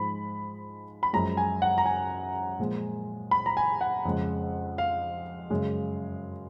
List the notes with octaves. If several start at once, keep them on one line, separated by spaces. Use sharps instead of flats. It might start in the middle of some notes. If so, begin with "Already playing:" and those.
Already playing: G#2 F3 G#3 B5
B5
F#2 F3 G#3 A#5
G#5
F#5
A#5
G#5
A#2 F3 G#3
B5
A#5
G#5
F#5
F2 C#3 G#3
F5
F#2 C#3 G#3